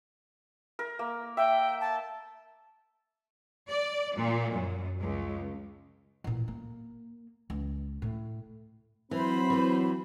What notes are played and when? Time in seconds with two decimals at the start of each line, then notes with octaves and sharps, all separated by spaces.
0.79 A#4
0.99 A#3
1.37 E5 G5
1.81 A5
3.68 D5
4.15 A#2
4.54 F#2
4.98 C#2
6.24 A1 A#2
6.48 A#3
7.50 C#2
8.02 A2
9.11 E3 F#3 C4 C5 B5
9.50 E3 B4